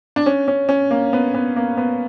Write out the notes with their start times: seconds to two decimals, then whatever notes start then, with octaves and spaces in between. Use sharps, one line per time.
0.16 D4
0.26 C#4
0.48 C#4
0.69 C#4
0.91 A#3
1.13 B3
1.34 B3
1.56 A#3
1.77 B3